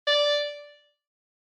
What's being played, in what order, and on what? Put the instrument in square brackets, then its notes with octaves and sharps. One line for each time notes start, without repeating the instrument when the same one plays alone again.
[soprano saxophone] D5